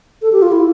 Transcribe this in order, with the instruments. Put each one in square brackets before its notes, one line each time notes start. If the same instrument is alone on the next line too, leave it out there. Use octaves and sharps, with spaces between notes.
[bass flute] A4
G4
F4
E4